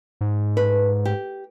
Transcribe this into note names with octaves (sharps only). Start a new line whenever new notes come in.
G#2
B4
G4